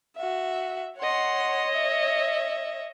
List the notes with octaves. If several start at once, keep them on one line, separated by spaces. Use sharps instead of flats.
F#4 E5
C#5 D#5 F#5 C6
E5